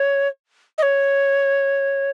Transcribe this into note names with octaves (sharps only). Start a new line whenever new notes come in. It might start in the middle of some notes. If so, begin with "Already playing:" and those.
Already playing: C#5
D#5
C#5